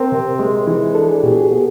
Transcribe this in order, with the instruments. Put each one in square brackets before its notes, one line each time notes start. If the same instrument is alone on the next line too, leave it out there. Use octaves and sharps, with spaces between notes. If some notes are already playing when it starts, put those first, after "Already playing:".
Already playing: [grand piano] C4 [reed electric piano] A#4 C5
[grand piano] C3
G#3
E3
[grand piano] D4 [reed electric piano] A4
[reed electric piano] G#4
[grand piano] B2 [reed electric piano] G4
[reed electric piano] F#4 G#4
[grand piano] B3